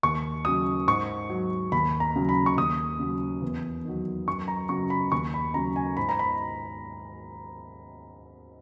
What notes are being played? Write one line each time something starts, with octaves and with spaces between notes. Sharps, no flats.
D#2 C#6
C#3 F#3 D#6
G#2 C#6
F#3
D#2 B5
A#5
C#3 F#3
B5
C#6
D#2 D#6
C#3 F#3
E2
D#3 F#3
F#2 C#6
A#5
C#3 F#3 C#6
B5
D#2 C#6
B5
C#3 F#3 A#5
G#5
G#2 B5
A#5
B5